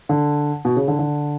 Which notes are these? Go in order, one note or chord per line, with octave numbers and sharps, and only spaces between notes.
D3
B2
C#3
D3
D3